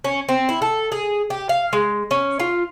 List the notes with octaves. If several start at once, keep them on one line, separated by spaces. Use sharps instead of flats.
C#4
C4
E4
A4
G#4
G4
F5
G#3
C#4
F4